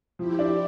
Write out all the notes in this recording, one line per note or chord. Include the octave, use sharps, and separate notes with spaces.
F3 E4 G4
D4